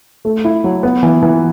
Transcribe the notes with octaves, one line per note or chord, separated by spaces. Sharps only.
A3
E4
F#3
B3
E3
E3